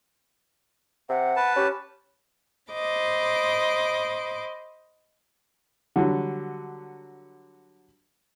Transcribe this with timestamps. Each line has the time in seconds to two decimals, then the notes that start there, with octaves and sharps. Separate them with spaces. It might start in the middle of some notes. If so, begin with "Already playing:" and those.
1.09 C3 F#5
1.36 B4 A5
1.56 C#4 G4
2.73 C5 D#5 B5 D6
5.96 D3 F#3 G3